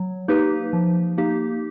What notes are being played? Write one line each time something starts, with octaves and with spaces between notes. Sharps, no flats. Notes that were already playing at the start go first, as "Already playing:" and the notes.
Already playing: F#3
A#3 D#4 G4 B4
F3
A#3 D#4 G4